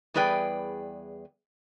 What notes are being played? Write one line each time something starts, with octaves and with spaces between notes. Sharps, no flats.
E2 G3 G#4 B4 D5 G5